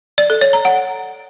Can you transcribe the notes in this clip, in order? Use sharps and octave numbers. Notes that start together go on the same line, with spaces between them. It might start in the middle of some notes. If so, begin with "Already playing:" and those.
D5
A4
C#5
A#5
F#5